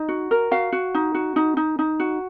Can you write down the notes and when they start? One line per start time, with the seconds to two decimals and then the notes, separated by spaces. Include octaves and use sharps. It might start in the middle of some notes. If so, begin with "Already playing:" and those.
Already playing: D#4 D#5
0.09 F#4
0.31 A#4
0.51 F#4 F5
0.73 F#4
0.94 D#4
1.14 F#4
1.36 D#4
1.57 D#4
1.79 D#4
2.00 F#4